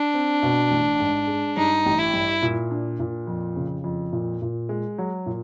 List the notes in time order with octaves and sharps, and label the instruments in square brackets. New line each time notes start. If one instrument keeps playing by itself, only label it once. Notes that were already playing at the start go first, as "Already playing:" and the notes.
Already playing: [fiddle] D4
[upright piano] C4
B2
A1
G#2
G#3
[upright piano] G2 [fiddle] D#4
[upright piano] A1
[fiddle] E4
[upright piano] G2
A#2
D4
A#2
F2
C#3
F2
A#2
A#2
G#3
F#3
A#2